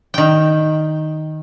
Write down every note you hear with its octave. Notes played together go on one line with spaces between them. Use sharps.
D#3 G5